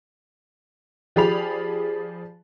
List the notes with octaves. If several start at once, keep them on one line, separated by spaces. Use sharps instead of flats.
F3 G4 G#4 D5 B5 F7